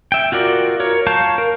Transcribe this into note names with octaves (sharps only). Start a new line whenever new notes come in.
E5 G5
F4 F#4 A#4 D5
A#4 C#5
F5 A5 A#5 C#6 G6
A#4